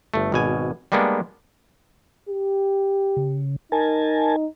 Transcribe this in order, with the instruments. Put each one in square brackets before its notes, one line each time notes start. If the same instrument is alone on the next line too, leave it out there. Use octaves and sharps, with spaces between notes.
[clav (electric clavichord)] G1 A3
G#1 B2 G#5
G3 G#3 A#3 B3 D4
[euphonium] G4
[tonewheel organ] C#3
[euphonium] D#4 [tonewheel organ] A#4 G#5 A5